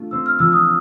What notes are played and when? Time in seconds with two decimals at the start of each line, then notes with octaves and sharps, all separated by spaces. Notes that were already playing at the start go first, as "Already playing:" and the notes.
Already playing: F3 A3 D4 F4
0.11 C4 E6
0.26 F6
0.39 F3 E6
0.52 D#6